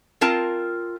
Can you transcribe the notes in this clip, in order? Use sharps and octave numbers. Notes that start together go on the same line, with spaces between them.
C4 F4 A#4 A5